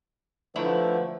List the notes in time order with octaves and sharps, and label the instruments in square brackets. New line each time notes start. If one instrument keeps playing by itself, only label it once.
[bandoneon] D3 F3 A3 [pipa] F#3 E4 [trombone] B4